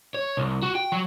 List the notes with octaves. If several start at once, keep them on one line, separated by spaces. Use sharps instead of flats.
C#5
C2
F#4
G5
F#3